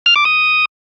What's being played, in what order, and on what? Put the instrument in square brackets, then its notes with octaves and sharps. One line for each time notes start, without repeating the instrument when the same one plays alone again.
[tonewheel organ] F6
D6
D#6